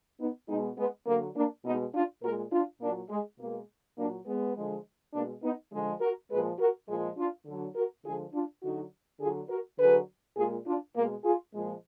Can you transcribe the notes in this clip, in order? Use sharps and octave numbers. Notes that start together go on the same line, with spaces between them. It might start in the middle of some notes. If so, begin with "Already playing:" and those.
B3 D#4
B2 G#3 B3 D#4
G#3 B3
D3 F#3 A#3
A#3 D4
B2 G#3 B3 D#4
D4 F4
A#2 G#3 F#4 A#4
D4 F4
A#2 F#3 A#3 D4
G#3
B2 G#3 A#3
A#2 F#3 A#3 D4
G#3 B3
D3 F3 G#3
B2 G#3 A#3 D4
B3 D#4
D3 F3 G#3
F#4 A#4
A#2 F3 G#3 G#4 B4
F#4 A#4
A#2 F3 G#3
D4 F4
D3 F#3
F#4 A#4
D3 F3 G#3 F4 G#4
D4 F4
D3 F#3 D#4 F#4
D3 F#3 F4 G#4
F#4 A#4
D3 F#3 G#4 B4
A#2 G#3 F4 G#4
D4 F4
B2 G#3 A#3
F4 G#4
A#2 F3 G#3